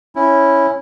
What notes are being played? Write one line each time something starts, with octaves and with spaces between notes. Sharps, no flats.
C#4 E4